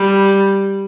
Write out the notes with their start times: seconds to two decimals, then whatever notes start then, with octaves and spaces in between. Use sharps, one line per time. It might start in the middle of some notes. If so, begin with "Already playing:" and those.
Already playing: G3